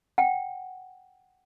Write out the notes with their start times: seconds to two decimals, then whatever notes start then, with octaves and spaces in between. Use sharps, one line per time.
0.18 F#5 G5